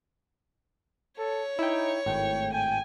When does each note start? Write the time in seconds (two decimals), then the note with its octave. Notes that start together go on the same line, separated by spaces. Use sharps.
1.18 A4 C#5
1.59 D#4 E4 G5
2.06 G#1 A2 G5
2.53 G5 G#5